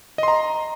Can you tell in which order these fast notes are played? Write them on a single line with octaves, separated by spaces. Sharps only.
D#5 C6 A#5